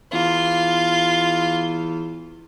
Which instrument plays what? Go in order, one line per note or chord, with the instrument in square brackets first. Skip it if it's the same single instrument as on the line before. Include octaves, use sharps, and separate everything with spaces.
[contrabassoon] E2 [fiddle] F4